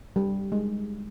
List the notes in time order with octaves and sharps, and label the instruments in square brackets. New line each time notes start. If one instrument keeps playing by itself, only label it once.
[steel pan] G3
G#3